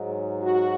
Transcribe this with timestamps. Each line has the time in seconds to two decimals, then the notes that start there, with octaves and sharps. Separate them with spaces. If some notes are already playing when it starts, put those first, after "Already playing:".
Already playing: G#2 F#3
0.42 F#4